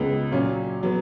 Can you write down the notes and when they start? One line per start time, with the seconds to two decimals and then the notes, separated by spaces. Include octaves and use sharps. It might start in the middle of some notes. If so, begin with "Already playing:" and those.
Already playing: C#2 C#3 G#3 B3
0.31 A#2 F#3 C#4 F4
0.83 F#3 B3